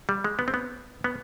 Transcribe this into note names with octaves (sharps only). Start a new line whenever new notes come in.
G3
G#3
B3
C4
B3
B3